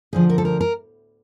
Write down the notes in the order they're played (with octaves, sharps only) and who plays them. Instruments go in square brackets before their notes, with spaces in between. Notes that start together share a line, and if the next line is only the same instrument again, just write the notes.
[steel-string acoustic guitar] D2 D3 F3 G#4
A#4
A4
A#4
A#4